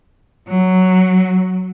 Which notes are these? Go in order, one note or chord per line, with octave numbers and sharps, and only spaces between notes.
F#3